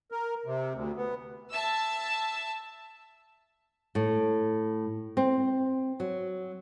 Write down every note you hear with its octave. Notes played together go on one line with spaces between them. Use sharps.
A#4
C3
D2
B3
E5 A5 E6
A2
C4
F#3